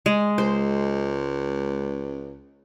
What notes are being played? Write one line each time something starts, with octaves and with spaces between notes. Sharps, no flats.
G#3
C#2 C5